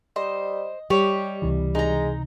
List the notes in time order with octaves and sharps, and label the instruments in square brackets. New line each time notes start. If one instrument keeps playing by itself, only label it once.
[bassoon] G3 [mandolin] C5 [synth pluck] D#5
[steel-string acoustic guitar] G3 [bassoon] G4 [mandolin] C#5
[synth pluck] C#2 C3 E3
[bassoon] G#3 [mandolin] D#4 A#5